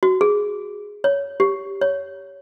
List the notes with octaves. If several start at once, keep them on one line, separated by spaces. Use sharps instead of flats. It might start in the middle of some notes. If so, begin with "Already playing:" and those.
F#4
G#4
C#5
G4
C#5